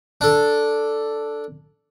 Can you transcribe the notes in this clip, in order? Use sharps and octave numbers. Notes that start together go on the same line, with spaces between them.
D4 A4